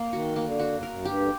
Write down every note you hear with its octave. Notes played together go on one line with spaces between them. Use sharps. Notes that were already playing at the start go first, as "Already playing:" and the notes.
Already playing: A#3
D#3 F#4
A#3
D3
F#4
F#2
A#4
F#2
G2 G4
D3